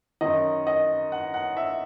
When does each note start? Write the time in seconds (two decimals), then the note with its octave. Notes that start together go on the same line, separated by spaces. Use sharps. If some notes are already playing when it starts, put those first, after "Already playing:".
0.21 F#2 D#3 D#5
0.67 D#5
1.12 F#5
1.34 F#5
1.57 E5